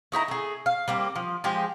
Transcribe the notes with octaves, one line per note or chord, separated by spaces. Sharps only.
A3 D#4 E4 A#5
A3 G#4
F5
G3 A#3 C4
F3
F3 G#3 G4